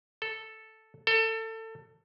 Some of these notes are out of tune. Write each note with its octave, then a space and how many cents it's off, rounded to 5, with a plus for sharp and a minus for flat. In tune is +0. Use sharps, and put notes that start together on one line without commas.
A4 +0
A4 +25